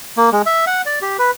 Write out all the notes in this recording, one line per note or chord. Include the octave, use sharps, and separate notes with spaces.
A#3
G#3
E5
F#5
D5
G4
B4